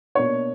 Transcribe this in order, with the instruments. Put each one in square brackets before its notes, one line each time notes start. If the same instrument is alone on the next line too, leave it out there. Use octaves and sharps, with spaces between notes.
[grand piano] B2 A#3 D4 C#5